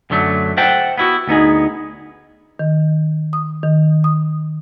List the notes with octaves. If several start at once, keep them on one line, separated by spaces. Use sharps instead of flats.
F#2 D3 F#3 A3
C5 E5 F#5 G5 A5
B3 E4 F#4
D2 B3 D#4 G#4
D#3
D#6
D#3
D#6